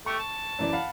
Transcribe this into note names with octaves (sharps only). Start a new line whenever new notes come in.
A3 G4 C#6 C#7
A5
F#2 E3 D5
F5 F#5 B5